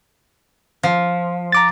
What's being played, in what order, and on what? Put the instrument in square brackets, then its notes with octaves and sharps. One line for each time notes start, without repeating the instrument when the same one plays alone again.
[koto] F3
[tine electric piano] A#5 D6 A6